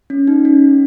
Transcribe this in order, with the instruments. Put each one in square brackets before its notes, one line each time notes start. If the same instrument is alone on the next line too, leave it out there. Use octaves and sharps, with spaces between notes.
[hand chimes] C#4
D#4
C#4